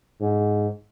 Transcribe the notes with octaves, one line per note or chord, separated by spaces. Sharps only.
G#2